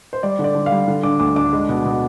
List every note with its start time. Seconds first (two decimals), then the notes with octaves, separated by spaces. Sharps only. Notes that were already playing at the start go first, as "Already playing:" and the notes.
0.13 C5
0.23 G3 D5
0.39 D3
0.44 D5
0.55 D3
0.66 F5
0.71 G3
0.88 D3
1.03 D4 D6
1.20 D2 D6
1.36 D4 D6
1.53 G#3
1.69 B2
1.85 B2